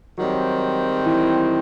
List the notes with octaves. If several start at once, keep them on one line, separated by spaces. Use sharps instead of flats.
G#2 D#3 F#3 G3 C4
E3